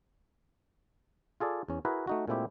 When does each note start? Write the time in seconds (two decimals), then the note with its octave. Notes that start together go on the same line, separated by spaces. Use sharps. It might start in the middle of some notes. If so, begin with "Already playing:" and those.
1.40 F4 G#4 A4 D5
1.69 E2 C#4
1.85 E4 F#4 G#4 A#4 B4
2.07 A3 D#4 F#4
2.28 A#2 G#3 A3 C4 E4 G4